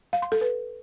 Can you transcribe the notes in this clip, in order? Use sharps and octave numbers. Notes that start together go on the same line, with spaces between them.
F5
C6
A4
B4